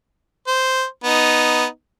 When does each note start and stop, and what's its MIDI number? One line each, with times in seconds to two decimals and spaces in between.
0.47 0.84 72
1.04 1.66 59
1.04 1.66 63